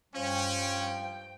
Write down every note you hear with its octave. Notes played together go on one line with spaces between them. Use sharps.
G2 F3 C#4 G5